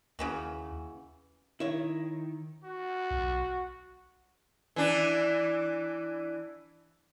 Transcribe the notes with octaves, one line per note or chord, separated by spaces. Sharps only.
D#2 C#3 E3 F#4
D#3 E4 C#5
F#4
B1
E3 D4